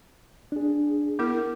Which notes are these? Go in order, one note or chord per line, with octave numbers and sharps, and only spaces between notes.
D4 G#4
B3 E4 A#4 D6